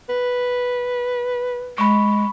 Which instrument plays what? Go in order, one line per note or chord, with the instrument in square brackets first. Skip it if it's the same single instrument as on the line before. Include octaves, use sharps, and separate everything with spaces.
[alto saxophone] B4
[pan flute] G#3 [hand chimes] B5 C#6